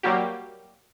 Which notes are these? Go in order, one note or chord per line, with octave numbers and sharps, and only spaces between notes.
F#3 G3 A#3 F#4 G4